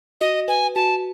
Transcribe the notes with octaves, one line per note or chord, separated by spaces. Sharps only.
F#4 D#5
B4 G#5
F#4 A5